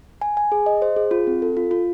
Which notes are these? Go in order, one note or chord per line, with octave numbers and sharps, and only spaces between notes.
G#5
G#5
G#4
D#5
C5
G#4
F4
C4
A4
F4
F4